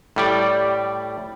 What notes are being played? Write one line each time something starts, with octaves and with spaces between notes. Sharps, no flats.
A2 G3 D5